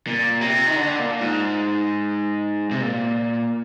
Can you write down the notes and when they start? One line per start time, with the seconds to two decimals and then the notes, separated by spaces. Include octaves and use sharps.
0.07 A#2
0.41 C3
0.66 D#3
0.76 D3
0.99 A#2
1.21 G#2
2.71 C3
2.81 A#2